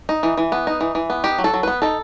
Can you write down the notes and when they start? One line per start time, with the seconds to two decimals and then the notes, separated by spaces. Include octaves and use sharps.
0.09 D#4
0.23 E3
0.38 E3
0.52 B3
0.67 D#4
0.81 E3
0.95 E3
1.10 B3
1.24 D#4 G4
1.39 F#3
1.44 A4
1.54 F#3
1.63 B3 B4
1.82 D#4 A4